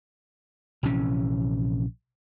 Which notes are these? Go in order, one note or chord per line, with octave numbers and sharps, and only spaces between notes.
A#1 C3 E3 C#4